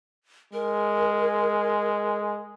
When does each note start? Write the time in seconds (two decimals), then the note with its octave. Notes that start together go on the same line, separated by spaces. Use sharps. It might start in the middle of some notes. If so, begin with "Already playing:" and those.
0.53 G#3 A#4